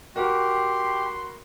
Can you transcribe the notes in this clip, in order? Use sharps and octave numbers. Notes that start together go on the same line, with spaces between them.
F#4 G4 A#4 B5 C6